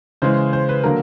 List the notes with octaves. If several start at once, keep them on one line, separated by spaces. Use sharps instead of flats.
C#3 E3 G#3 C5
C5
B4
D3 F#3 A#3 A#4